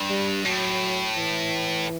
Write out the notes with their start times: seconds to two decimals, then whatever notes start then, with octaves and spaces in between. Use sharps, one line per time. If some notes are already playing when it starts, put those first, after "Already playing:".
Already playing: G2
0.10 G3
0.45 A2 F#3
1.17 E3